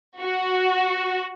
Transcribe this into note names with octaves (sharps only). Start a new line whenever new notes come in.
F#4